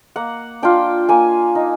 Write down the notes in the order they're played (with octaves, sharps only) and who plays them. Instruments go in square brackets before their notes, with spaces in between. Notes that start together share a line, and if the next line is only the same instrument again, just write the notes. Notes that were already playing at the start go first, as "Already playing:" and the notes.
[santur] A#3 F#5
D4 F4 G5
A#3 G#5
D#4